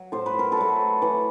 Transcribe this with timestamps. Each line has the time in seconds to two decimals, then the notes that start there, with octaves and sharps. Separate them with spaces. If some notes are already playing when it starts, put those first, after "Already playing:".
Already playing: F#3
0.12 A2 C5
0.26 B4
0.39 A#4
0.52 A4 B4
0.57 F#3 A3
1.02 E3